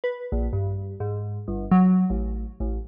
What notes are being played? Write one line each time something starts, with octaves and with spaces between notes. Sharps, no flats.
B4
A#1
G2
G#2
G1
F#3
A1
A1